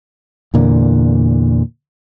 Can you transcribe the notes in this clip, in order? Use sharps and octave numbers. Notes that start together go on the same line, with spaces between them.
E2 A#2 D3